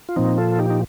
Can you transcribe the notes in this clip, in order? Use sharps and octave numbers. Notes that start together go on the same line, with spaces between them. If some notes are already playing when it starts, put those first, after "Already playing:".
F4
A#2 F3 C4 D#4
F4 A4
D#4 G4
D#4